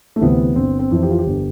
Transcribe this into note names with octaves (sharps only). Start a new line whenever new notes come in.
A3
D2 C3 E3 B3
G1 C4
C4
F2 E3
G4
F4
G4
G1